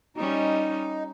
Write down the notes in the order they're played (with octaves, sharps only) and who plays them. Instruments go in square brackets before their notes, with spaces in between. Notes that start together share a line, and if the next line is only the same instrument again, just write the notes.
[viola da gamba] G3 C#4 [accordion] D#4